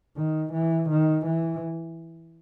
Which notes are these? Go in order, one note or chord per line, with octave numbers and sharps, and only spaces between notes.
D#3
E3
D#3
E3